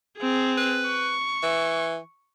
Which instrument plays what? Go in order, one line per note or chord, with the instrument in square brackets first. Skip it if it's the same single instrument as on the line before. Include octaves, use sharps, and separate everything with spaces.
[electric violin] C4 G#4
[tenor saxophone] B4
[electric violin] C#6
[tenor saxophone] E3